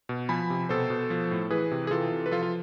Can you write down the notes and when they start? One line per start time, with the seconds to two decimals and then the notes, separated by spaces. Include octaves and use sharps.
0.09 B2
0.29 F3 G#5 B5
0.50 C3
0.69 B2 A4 C5
0.90 B2
1.10 F3
1.31 A2
1.51 E3 G#4 B4
1.71 C3
1.87 G#4
1.91 E3 F4 A4
2.12 C3
2.26 B4
2.32 F3 F4 A4
2.43 F4